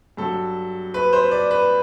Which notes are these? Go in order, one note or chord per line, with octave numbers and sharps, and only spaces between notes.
G2 F#3 A4
B4
C5
D5
B4